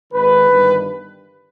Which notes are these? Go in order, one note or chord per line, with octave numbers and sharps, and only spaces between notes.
G#1 G#2 D#3 B4
G1 G2 D#3